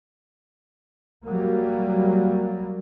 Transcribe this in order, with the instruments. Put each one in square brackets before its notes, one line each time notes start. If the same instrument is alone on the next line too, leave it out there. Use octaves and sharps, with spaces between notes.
[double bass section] F#3 G3 A#3